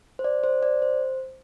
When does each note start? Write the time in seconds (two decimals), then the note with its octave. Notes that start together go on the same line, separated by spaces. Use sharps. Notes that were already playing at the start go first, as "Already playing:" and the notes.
0.19 C5
0.24 D5
0.44 C5
0.63 D5
0.82 C5